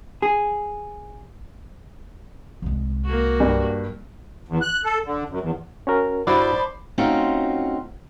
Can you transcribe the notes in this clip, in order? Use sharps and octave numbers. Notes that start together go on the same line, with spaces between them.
G#4
C2 G#3
A#3 F#4
G2
E2
F#6
A4
D3
F#2
E2
C#4 F#4 A#4
G2 E4 F#4 C5 D5 A5 B5
A3 C4 C#4 D#4 F4 F#4